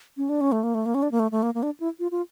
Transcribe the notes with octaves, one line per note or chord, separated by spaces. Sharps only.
C#4
D4
C#4
A3
A#3
A3
A#3
C#4
D4
A#3
A3
A3
A#3
A#3
D4
E4
F4
F4